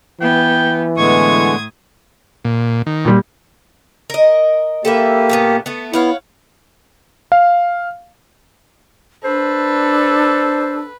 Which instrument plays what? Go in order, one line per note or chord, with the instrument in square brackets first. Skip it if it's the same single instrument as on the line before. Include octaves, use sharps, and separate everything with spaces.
[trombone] E3 [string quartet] B3 [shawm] G5
[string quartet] A2 D#6 G#6 [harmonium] D3 G#3 B3 [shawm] C#6
[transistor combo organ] A#2
D#3
[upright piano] A#2 G3
[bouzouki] A#4 D#5
[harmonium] A#3 G4 [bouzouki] A4 B4 E5
[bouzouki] A#2 A3 B3
A3 B3
[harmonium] B3 E4 [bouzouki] C#5 F5 F#5
[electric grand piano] F5
[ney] D4 [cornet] A4 [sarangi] B4 [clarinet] C5